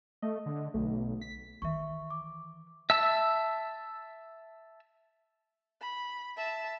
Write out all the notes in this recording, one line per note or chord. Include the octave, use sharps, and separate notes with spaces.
A3 D#5
D3
B1 A3
B6
D#3 E3 E5 C#6
D6
E5 A5 E6
B5
E5 A5